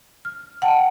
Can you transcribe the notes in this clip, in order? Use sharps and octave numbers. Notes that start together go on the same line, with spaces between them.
F6
F#5 G5 A5